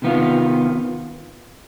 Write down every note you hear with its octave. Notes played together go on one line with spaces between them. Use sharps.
C3 D#3 B3 F4